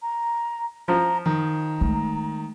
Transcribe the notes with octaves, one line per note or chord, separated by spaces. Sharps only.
A#5
F3 A#5
D#3 A#5
G#3 A3